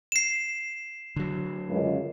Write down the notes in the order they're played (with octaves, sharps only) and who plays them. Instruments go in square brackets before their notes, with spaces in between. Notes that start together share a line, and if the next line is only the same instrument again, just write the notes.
[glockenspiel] C7 E7
[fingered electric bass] D3 F#3
[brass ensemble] C#2 F#2